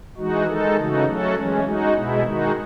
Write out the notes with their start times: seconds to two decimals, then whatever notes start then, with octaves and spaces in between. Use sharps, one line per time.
0.17 E3 G#3 D#4 F#4
0.47 D#3 G#3 D#4 A4
0.76 C#3 E3 A3 D#4 F#4
1.06 F#3 A3 C#4 F#4 A4
1.35 E3 G#3 C#4
1.64 G#3 D#4 F#4
1.94 B2 G#3 B3 E4
2.23 D#3 G#3 D#4 F#4